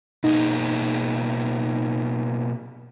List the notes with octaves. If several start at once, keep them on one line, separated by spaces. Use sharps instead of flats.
B2 A#3 D#4 G#4